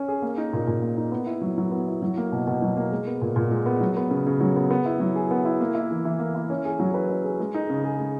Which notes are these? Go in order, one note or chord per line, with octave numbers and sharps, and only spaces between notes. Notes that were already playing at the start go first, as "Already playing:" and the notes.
Already playing: C#4
G#4
A#3
D#4
A#2
A#2
A#3
D#4
B3
E4
F#3
F#3
B3
E4
F#3
A#3
B2
B2
F#3
A#3
G#3
B3
A#2
A#2
G#3
B3
F#3
B3
C#3
C#3
F#3
B3
B3
E4
F#3
G#4
B3
E4
A#3
E4
E3
E3
A#3
E4
C#4
G#4
F#3
B4
C#4
G#4
G#3
D#4
C#3
G#4
G#3